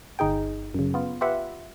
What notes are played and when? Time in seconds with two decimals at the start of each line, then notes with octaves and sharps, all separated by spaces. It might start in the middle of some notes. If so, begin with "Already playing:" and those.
0.19 G1 D#4 G#4 G5
0.74 F#2 C#3
0.94 B3 F4
1.21 F4 G4 B4 E5 F#5